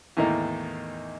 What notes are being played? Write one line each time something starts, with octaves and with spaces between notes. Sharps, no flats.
E2 A2 D#3 A#3 D#4